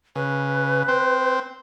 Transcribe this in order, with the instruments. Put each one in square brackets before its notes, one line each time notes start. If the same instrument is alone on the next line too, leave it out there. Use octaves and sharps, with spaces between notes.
[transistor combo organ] C#3 [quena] B4
[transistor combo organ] C4 C5